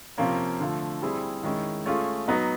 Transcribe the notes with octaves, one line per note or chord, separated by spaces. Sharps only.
C3 F3 A#3 C#4
D3 F3 A3
G3 C4 E4 G#4
D#3 G#3 C#4 E4
A3 C#4 F4 G#4
F#3 B3 D#4